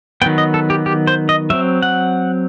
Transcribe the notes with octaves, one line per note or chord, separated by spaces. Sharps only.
D#3 F#3 B3 G5
D#5
A4
G4
G4
C5
D#5
F#3 C4 E5
F#5